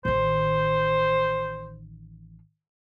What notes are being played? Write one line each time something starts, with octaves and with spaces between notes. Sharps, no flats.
A1 D#3 C5